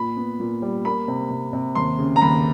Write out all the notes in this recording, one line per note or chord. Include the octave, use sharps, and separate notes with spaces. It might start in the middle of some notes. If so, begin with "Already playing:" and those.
Already playing: A#2 B5
B3
A#2
G3
A#3 B5
C3
C3
C3
D#2 C6
C#3
A#5
D#2 B5